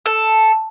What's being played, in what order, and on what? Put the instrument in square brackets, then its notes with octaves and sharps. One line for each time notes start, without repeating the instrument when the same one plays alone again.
[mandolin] A4